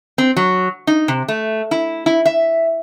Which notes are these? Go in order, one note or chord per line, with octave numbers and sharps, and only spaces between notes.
C4
F#3
D#4
C3
A3
E4
E4
E5